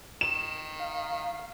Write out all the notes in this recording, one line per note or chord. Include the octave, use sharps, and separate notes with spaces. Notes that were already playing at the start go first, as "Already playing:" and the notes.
D#3 E7
F5